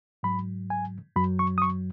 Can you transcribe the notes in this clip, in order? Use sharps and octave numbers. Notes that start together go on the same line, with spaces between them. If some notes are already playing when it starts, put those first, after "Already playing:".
G#2 F#3 B5
G#5
F#2 F#3 B5
C#6
D#6
C#6